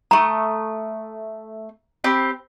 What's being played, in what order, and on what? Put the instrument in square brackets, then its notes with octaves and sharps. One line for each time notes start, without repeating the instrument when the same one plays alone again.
[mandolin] A3 C#6 D#6 [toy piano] A#5
[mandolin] C4 G4 B5